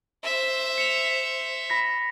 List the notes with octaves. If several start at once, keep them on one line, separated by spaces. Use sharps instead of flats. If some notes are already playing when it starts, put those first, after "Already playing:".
C5 E5
C#7 F7
B5 A#6 B6